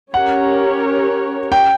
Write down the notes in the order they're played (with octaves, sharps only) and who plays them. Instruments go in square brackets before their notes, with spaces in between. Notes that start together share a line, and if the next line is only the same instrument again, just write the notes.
[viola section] C#4 G4 A#4 C#5 [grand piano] F#5
[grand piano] G5